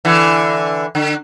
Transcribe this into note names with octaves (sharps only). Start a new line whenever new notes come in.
D3 E3
D3